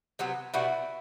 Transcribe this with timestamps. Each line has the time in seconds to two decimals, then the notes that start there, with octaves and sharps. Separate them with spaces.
0.19 C3 F#3 B3
0.54 B2 G3 B3 E4 F#4